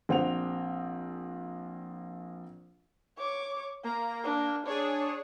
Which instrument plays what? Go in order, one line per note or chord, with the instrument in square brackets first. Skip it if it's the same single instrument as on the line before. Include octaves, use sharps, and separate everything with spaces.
[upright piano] A#1 C4 F#5 F7
[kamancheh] C#5 D6
[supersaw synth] A#3 [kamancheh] A#5
[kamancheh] D4
[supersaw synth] D4 G#4 [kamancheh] C#5